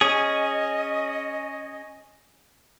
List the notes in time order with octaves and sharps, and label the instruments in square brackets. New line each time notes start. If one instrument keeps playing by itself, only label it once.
[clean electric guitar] C#4 G#4 [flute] D#5